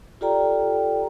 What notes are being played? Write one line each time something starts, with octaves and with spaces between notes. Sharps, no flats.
F4 G4 A4 D5 G5 A#5